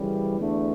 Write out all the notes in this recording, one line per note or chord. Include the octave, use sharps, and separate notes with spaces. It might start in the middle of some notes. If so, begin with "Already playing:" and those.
Already playing: F#2 C#3 E3 G3
E2 D3 A3 D4